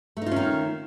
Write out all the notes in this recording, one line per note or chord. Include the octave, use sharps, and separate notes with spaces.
D#3 A3 C#4 D#4 F4